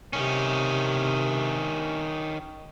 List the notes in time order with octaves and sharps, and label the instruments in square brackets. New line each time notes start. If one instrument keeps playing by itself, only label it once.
[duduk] C3 [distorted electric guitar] D#3 C#4